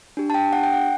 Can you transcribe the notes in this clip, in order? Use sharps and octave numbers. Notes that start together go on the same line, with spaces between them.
D4 G4
A5
G5
F#5
G5
F#5